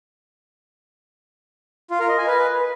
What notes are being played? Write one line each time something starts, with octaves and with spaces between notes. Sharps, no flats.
F4
A#4
D#5
G#5
B4